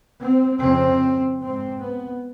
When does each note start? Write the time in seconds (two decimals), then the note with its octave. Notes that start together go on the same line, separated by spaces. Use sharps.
0.19 C4
0.59 F2 C#3 C4
1.40 G#2 C4
1.80 B3